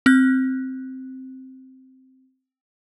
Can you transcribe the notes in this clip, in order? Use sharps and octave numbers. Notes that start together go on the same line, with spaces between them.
C4 F#6